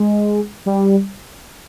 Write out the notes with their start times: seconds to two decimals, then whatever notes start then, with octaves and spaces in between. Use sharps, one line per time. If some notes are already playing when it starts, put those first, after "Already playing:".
Already playing: G#3
0.66 G3